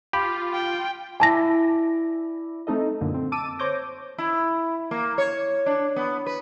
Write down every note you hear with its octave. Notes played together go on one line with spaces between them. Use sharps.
F4 G4 B5
G5
E4 D5 G#5 A5 A#6
A3 C4 D#4 A4 D#5
F#2 A#2 D3
C4
A5 D6 E6 D#7
C5 C#5 D6 G6 A#6
E4
A#3
C#5
D4
B3
B4